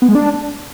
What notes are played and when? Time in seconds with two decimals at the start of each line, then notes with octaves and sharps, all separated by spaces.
0.02 B3
0.08 G#3
0.15 D4